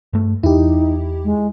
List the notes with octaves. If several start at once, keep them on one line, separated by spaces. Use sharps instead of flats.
G2 A3
E2 D#4 E4 G4
G#3